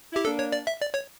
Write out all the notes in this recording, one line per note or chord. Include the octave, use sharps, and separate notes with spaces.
E4 G4
A#3 D4 A4
C#5
D5
E5
D5
C#5